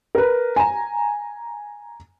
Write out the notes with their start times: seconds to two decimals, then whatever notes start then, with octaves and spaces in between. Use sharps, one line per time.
0.15 A#4 B4
0.56 G#5 A#5